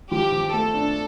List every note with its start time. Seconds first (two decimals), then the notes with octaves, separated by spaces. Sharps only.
0.11 F3 G4
0.32 F3
0.53 A3 A4
0.74 D4